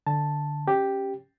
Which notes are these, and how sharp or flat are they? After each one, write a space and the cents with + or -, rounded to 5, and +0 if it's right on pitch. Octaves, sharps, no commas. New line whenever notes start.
D3 +0 A5 +0
C#4 -5 G4 +0